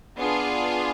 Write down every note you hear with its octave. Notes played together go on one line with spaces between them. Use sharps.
B3 D4 F4 G#4